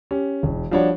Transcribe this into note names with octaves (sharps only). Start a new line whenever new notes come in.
C#4 G4
E1
F3 G3 D4 F#4 C#5